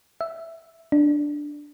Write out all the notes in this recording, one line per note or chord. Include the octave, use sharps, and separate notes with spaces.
E5
D4